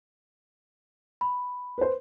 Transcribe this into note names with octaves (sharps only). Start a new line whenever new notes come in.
B5
B4 C5